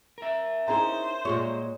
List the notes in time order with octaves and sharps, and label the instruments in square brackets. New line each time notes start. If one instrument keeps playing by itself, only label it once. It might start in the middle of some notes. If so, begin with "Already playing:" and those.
[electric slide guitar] A#4 E5
[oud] C#4 D#4 [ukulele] E4 G#4 A#5 [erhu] C5
[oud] A#2 G#3 C#5 [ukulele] F4 G4 G#4